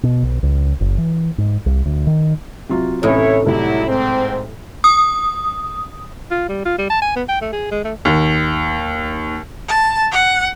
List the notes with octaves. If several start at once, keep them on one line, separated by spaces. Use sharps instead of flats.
B2
B1
C#2
F#1
E3
G#2
C2
D2
D#3
C3 F#3 F4
A2 C3 E3 C#4 D#4 E4 C#5
C2 F#3 G3 A3 E4
G#2 C4
D#6
F4
G3
F4
G3
A5
G#5
B3
G5
A3
G#4
G#3
A3
D#2
A5
F#5